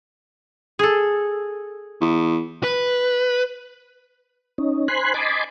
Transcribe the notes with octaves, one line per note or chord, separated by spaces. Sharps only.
G#4 A4
E2
B4
C#4 D#4
C5 G#5 B5 C6 F#6
D#5 G#5 A5 B5 C6 D6